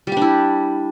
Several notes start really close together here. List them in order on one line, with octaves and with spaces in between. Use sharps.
G3 G4 D4 E4